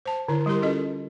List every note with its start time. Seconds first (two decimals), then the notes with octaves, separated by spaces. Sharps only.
0.06 C5 A5
0.28 D3 E4 C#5
0.46 G3 E4 G4 A#4 C6
0.62 C#4 F4 G#4 A4 D#5